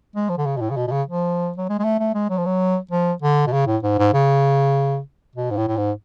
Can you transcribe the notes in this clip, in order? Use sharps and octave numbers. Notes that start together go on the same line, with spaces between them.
G#3
F3
D3
C#3
B2
A2
C#3
B2
B2
C#3
F3
F#3
G#3
G#3
A3
A3
G#3
F#3
F3
F#3
F3
D3
B2
C#3
A2
G#2
G#2
C#3
B2
G#2
A2
A2
G#2